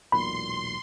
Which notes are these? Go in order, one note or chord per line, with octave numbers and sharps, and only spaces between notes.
E1 B1 A#2 B5 C6